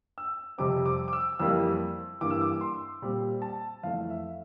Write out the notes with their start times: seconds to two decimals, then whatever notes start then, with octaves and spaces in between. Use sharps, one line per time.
0.18 E6
0.58 F2 C3 G3 C4 D6
0.86 D6
1.08 D6
1.13 E6
1.39 F2 E3 G3 A#3 E6
2.21 G2 E3 A#3 D6
2.30 E6
2.41 D6
2.61 C6
3.02 A#2 G3 C4
3.42 A5
3.83 F2 E3 A3 F5
4.01 F5
4.10 E5